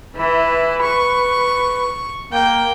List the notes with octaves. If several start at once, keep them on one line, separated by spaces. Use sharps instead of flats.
E3 E4 B4
C#6
A#3 G5